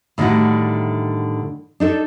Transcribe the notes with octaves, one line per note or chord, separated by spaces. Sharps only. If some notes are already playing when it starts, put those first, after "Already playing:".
A2 D3 D#3 G3 E4 F#4
D4 D#4 A4